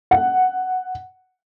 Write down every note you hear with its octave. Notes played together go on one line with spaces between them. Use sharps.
F#5